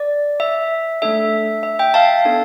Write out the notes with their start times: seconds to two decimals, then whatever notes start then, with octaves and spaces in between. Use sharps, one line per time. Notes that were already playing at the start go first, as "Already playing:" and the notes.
Already playing: D5
0.40 E5
1.02 A3 D4 A4 E5
1.63 E5
1.79 E5 G5
1.94 F5 A5
2.25 B3 D4 A4